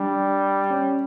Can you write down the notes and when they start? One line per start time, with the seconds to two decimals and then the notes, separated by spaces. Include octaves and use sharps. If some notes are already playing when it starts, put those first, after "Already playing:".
Already playing: G3 D4
0.70 C#4